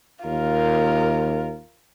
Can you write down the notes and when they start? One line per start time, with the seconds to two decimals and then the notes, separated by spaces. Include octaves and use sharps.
0.25 D#2 F4 A#4